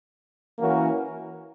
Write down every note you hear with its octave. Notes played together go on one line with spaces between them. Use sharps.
E3 A#3 C#4 F#4 A#4